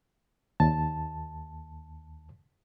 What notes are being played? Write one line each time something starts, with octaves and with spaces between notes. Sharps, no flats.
D#2 A5